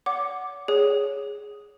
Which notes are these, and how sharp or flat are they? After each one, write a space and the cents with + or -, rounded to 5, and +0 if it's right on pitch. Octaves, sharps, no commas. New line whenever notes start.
C#5 +45 F#5 +0 D6 +0
G#4 +0 C#5 +0